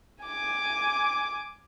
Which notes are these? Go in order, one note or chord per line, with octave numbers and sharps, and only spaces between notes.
G#5 D6